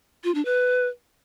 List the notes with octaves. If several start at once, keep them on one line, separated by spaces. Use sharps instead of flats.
F4
D4
B4